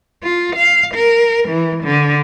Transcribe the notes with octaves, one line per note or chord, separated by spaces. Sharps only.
F4
F5
A#4
E3
D3